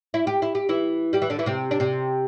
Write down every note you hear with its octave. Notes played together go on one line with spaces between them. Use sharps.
E4
G4
E4
G4
E3 E4
G3 G4
E3 E4
D3 D4
E3 E4
C3 C4
D4
C3 C4